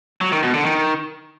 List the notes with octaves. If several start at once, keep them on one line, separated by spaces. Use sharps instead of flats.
F#3
D#3
B2
D3
D#3